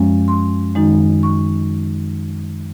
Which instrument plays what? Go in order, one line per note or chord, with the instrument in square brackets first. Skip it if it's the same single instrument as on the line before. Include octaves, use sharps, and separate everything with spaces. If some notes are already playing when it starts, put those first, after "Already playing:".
Already playing: [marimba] F#2 F3 G#3 C#4
C6
F#2 D#3 G#3 D#4
C#6